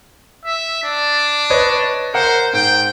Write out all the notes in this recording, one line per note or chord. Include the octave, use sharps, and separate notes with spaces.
E5
D4
B4 C#5 D#5
A#4 C5 F#5
G#2 G5